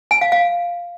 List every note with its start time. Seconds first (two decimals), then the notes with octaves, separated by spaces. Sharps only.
0.11 G#5
0.21 F5
0.32 F5